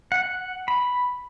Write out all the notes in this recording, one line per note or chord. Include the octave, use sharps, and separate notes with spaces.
F#5
B5